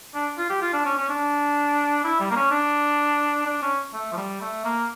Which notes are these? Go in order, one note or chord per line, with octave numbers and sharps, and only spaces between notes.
D4
F4
G4
F4
D4
C#4
C#4
D4
E4
G3
A#3
C#4
D4
D4
C#4
A3
F3
G3
A3
A#3